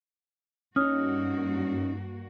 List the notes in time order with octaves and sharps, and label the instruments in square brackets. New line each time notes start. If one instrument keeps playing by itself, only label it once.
[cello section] G2 A#3 F#4 [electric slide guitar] C#4 D#4 [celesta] C#5 D#6 F6